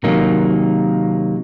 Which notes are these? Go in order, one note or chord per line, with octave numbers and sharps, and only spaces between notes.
C3 D#3 F#3 A#3 D#4